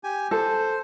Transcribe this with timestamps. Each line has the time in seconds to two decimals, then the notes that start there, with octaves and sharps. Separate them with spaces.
0.04 G4 G#5
0.31 A4 C5